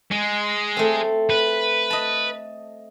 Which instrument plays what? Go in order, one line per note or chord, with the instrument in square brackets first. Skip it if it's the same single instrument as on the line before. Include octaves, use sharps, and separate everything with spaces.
[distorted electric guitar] G#3
[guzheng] A3 C4
[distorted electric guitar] B4
[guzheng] D#5 A5